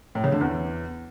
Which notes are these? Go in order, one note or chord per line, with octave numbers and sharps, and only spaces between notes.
A2
C#3
D3
E2